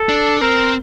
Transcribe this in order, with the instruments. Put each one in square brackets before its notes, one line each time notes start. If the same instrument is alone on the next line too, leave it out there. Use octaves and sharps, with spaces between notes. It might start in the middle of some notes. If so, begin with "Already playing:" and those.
Already playing: [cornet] A4
[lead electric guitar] D4
[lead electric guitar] C4 [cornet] A#4